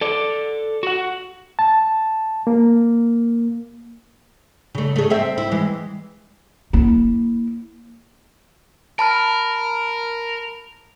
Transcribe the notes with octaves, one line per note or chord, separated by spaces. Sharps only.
A4 D5
F#4 F#5
A5
A#3
C#3 A3
A3 G#4
C4 C5 E5
E4
E3 G#3
A#3 E4
A#4 A5 B5 F6